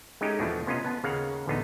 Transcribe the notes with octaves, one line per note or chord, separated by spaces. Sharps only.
G#3 A3 C#4 D#4 G4
E2 B2 F3 A3 D4
C3 B3 C#4 F4 D#5 A#5
B3 A5
D#2 C#3 A#3 F5 F#5
A1 D2 D3 B3 D4 D#4